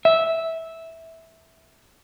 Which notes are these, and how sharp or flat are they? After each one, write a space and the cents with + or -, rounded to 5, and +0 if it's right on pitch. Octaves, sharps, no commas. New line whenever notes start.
E5 -10